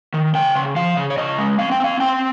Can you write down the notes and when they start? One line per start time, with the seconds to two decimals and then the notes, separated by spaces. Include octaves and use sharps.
0.14 D#3
0.34 C#3 G5
0.55 C#3
0.76 F3 F5
0.97 C#3
1.10 C#5
1.17 C#3 D#5
1.38 G#3
1.59 C4 F5
1.72 G5
1.80 C4 F5
2.00 C4 G5